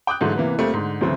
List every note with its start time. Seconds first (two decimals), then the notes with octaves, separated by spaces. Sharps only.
0.07 G5 D6 D#6 F#6
0.21 G#2 D3 E3 F#3 A3
0.36 C3 E3 A#3 B3
0.58 F2 G3 A3 A#3 C4
0.74 G#2 D3
1.01 D2 C#3 E3 F#3 A3 C4